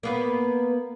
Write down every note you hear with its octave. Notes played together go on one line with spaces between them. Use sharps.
A#3 B3 B4